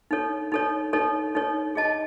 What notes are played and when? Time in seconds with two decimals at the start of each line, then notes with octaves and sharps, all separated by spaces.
0.11 D#4 A4 C#5
0.52 D#4 A4 C#5
0.93 D#4 A4 C#5
1.35 D#4 A4 C#5
1.75 G#4 D#5 A5